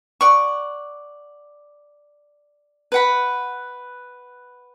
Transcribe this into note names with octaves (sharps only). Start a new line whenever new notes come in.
D5 F#5 C#6
B4 F#5 B5